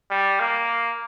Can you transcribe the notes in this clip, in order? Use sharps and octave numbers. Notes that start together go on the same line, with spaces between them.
G3
A#3